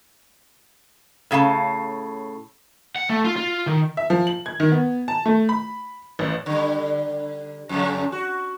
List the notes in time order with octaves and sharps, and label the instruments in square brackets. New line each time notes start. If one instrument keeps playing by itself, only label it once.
[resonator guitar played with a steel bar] A2 C#3 F5 A5
[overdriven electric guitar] F#5
A3
F4
F4
D#3
[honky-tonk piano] E5
F3
F#7
G#6
D#3
B3
A5
A3
B5
A1
[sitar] D3 G3
F2 C#3
F#4